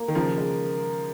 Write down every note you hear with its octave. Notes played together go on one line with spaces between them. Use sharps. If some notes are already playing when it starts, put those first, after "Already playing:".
Already playing: A#3
D#3
C#3 F3 A#4
G#3